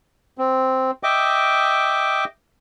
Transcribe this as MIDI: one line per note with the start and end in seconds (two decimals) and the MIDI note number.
0.38 0.91 60
1.03 2.25 75
1.03 2.25 76
1.03 2.25 79
1.03 2.25 86